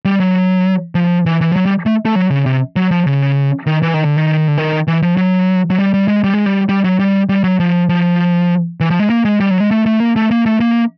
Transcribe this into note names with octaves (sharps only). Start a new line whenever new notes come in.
G3
F#3
F3
E3
E3
F3
F#3
G3
A3
A3
F#3
C#3
C3
F#3
F3
C#3
D#3
E3
D#3
D3
D#3
D3
D#3
E3
F3
F#3
F#3
G3
G3
G#3
G3
G#3
G3
G3
F#3
G3
G3
F#3
F3
F3
E3
F3
G#3
A#3
G#3
G3
F#3
G#3
A3
A3
A#3
A3
A#3
A3
A#3